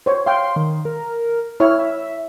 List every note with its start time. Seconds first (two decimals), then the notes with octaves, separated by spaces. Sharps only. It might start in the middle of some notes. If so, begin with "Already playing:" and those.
0.06 C5 C#5
0.26 F5 G5 C6
0.56 D#3
0.85 A#4
1.60 E4 C#5 F6
1.79 E5